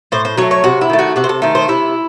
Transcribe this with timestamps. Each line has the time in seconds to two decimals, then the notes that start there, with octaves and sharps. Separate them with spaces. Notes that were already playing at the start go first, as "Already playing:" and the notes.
0.12 A2 C5
0.25 C5
0.37 F#3 A3 C#5
0.51 C#5
0.64 C3 F#4
0.81 E4
0.90 D#3 A3
0.99 F#4
1.16 C3 F#4
1.24 C5
1.29 A4
1.42 D#3 A3 C5
1.55 C5
1.68 C3 E4